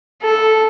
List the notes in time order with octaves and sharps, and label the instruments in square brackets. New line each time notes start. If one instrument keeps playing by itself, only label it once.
[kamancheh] A4